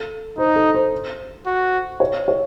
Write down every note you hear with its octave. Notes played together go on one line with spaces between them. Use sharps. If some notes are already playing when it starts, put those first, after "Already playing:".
Already playing: A4
D#4 C5
A4
C5
F#4
C#5
C#5